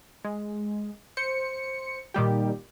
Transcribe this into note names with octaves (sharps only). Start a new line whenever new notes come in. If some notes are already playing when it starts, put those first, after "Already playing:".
G#3
C5 C#7
A#2 D#3 G3 G4